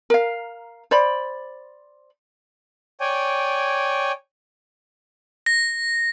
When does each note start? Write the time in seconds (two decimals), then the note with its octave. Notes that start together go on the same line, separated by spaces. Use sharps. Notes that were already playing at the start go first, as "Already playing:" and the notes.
0.10 A#4 F5
0.91 C5 D5 B5
3.00 C#5 D5 G5 G#5
5.46 A#6